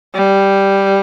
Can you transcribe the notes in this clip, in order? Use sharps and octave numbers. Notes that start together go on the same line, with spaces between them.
G3